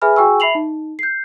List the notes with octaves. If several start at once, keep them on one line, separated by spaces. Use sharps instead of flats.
G#4 B4 E5 G#5 B5 F6
F#4 G#4 G5 G#5 C#6 E6
E5 B5 C7 F7 F#7
D#4
G6 C7